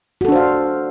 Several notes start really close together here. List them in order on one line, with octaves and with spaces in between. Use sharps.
F#4 A4 D4 C5 F5